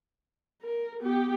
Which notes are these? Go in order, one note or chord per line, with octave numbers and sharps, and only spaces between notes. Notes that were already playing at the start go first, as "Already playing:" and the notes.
A#4
B3 G4